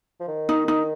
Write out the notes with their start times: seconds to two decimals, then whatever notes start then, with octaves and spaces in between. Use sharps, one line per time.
0.20 F3
0.28 D#3
0.49 D#4
0.68 D#4